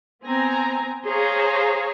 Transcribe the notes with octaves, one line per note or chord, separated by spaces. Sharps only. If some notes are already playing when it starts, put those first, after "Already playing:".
B3 C4 G#5 A#5
G#4 C5 C#5 F5 A#5